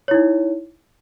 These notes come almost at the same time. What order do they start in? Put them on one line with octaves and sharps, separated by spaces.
C#5 E4 D#4